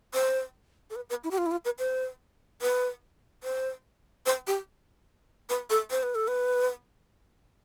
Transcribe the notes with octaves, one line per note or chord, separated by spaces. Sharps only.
C5
A4
B4
B4
E4
G4
F4
E4
F4
B4
C5
B4
C5
C5
G4
B4
A4
C5
B4
A4
B4